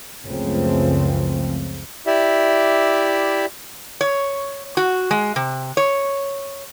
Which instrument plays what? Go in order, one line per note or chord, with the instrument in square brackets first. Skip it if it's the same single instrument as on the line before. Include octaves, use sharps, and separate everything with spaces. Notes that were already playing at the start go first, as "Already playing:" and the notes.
[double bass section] C#2 F#2 C#3 F3 A3 C4
[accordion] E4 G4 D5 E5
[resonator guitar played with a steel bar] C#5
F#4
G#3
C3
C#5